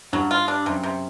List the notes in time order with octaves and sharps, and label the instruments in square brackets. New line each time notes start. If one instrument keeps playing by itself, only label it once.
[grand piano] G2 [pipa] F#3
[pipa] F4
D4
[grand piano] F#2 [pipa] C3
[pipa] C3